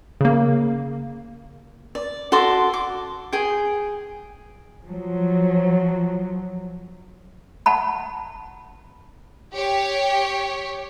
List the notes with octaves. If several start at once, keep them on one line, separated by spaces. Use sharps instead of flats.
C#3 A#3
D5
F#4 A4 C6 D6
D6
G#4 G5
F3 F#3
F#5 A5 B5
G4 C#5